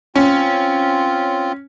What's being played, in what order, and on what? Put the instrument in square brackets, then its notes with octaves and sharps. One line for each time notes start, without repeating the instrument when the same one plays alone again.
[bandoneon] C4 F4 [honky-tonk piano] C#4